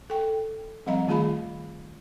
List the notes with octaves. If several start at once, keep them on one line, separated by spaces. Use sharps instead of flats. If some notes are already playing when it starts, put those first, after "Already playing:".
A4 G5
F3 G3 C4 D#5 F5 A#5
D#3 A3 F4 G#4 F5 B5